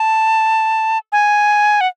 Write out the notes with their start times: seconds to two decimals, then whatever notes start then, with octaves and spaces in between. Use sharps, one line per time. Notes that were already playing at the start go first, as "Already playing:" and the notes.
Already playing: A5
1.12 G#5
1.81 F#5